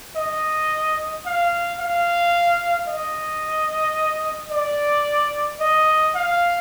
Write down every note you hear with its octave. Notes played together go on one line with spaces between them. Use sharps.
D#5
F5
F5
D#5
D5
D#5
F5